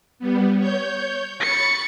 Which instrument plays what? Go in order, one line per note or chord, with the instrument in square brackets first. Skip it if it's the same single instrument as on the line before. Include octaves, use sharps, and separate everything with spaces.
[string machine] G3 B3
C#5 G6
[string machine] B5 C#6 A6 [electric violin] C#7